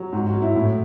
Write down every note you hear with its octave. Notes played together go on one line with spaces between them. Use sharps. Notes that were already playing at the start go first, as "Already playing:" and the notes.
Already playing: F#3
G#2 F#4
F#4
F#3
E4
A2